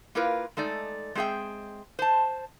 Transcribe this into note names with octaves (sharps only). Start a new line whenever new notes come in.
A#3 E4 F4 A#4 B4
G#3 A3 D#4 D5
G#3 C4 G#4 E5 G5
C5 A5